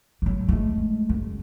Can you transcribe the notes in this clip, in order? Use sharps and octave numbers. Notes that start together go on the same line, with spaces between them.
F#3 A3
G#3 A3
F#1